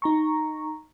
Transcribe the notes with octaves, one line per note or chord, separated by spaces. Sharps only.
D#4 A#5 C#6